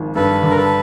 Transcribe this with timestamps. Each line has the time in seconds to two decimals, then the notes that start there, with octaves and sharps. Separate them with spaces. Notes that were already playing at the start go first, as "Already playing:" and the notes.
Already playing: G#1 F3
0.15 G2 A4 B4
0.43 D3
0.50 A#4
0.56 A4 B4